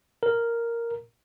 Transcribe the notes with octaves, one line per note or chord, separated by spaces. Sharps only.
A#4